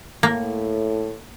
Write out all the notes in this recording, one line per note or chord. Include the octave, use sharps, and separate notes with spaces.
A2 A#3